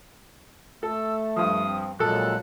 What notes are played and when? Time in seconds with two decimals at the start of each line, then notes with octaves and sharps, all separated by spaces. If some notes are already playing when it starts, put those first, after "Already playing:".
0.83 A3 A4 E6
1.36 G2 F3 D#6
1.64 C4
1.99 A#1 A#2 F#3 G#3 A4 F#6